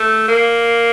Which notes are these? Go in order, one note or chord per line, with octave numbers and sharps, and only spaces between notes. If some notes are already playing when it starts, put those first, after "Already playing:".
Already playing: A3
A#3